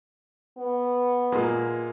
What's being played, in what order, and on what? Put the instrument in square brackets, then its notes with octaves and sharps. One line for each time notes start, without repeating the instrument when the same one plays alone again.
[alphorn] B3
[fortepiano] A#2 G#3 A#3